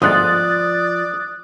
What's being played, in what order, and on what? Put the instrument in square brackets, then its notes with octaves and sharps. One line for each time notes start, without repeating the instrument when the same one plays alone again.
[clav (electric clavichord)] G1 D2 G#2 [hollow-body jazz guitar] F3 [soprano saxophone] D5 [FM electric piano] D#6 F#6 A6